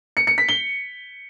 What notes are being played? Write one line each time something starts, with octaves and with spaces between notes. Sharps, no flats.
C#7
C#7
B6
G7